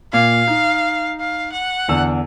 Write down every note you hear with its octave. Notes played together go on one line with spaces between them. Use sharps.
A#2 F5
D#4
F5
F#5
E2 D3 E6